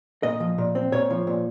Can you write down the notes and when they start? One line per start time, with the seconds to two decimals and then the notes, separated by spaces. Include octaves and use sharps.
0.23 A#2 D#5
0.40 F3
0.58 A#2
0.75 C4
0.92 A#2 C#5
1.10 F3
1.27 A#2